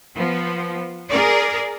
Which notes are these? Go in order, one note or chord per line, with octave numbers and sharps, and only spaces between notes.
F3 B3
G#4 A#4 D5